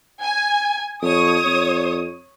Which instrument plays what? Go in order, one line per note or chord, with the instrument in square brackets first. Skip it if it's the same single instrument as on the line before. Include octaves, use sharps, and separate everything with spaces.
[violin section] G#5
[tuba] F2 [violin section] C#5 D#6
[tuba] F2